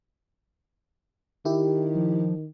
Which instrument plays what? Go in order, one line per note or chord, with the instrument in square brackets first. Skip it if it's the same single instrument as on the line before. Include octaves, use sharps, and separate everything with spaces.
[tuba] D#3 [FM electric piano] E4 G4
[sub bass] F3